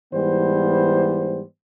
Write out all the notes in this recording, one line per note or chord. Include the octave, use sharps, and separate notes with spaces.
G#2 E3 G3 B3 C5